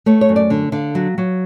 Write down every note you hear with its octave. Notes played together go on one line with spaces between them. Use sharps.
A3 C#5
C#5
F#2
D5
D3
D3 F5
F#3
F#3